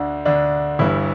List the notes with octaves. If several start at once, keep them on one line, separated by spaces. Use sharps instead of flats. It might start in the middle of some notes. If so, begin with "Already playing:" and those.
Already playing: D2 D3 D4
D2 D3 D4
G1 G2 E3 E4